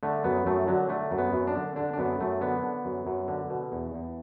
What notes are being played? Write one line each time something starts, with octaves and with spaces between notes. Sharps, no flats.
D3 A3
F#2 B3
F#2 A3
D3 F#3
D3 A3
F#2
B3
F#2
D4
D3
D3 D4
D4
F#2 B3
F#2 A3
D3 B3
D3
F#2
F#2
D3
B2
E2
E2